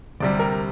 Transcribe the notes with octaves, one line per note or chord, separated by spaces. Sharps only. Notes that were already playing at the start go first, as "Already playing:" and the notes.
D2 C3 G3 D5
A#4